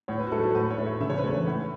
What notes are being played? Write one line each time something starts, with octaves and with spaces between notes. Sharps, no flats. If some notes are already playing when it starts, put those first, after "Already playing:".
A2 C#5
B4
F#4
F#3 A3 A4
A4
A2 B4
C#5
A3
E5
C#3 E5
C#5
B4
E3 A3 C#5
A2